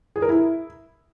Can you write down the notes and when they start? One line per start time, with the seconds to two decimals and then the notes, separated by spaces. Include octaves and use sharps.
0.16 G#4
0.22 A#4
0.29 E4